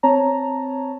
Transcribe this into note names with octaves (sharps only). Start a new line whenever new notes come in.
C4 C#5 A5 A#5